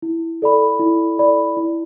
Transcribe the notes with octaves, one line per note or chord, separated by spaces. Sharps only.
E4
A4 D5 B5
E4
A4 D5 B5
E4